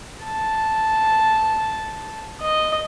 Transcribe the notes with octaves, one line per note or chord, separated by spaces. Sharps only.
A5
D#5